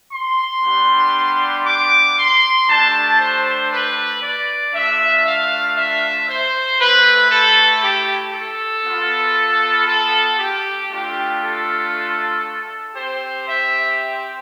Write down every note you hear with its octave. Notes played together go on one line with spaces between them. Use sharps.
C6
G3 B3 D4 G4
D6
C6
A3 D4 G4 A5
C5
B4
D5
A3 D4 F4 E5
F5
E5
C5
A3 E4 G4 B4
A4
G4
A4
B3 F4
A4
G4
A3 D4 F4 G4
A4
C4 G4 C5
E5